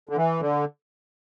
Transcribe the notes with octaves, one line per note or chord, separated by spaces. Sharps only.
D3
E3
D3